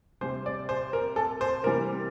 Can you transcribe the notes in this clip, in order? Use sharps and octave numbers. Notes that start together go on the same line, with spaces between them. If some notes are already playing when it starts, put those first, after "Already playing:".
C3 G3 C5
D5
C5
A#4
A4
C5
C3 E3 G3 A#4